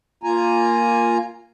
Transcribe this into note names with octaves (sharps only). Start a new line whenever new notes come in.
A#3 F4 G#5 A#5